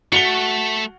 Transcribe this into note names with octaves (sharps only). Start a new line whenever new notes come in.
A3 F#4 C#7 F7 G7